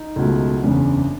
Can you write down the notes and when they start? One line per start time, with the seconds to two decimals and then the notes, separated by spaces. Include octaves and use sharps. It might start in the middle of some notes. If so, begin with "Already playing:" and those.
Already playing: D#4
0.16 C#2 B2 F#3 A3
0.63 F#1 E2 C#3 D4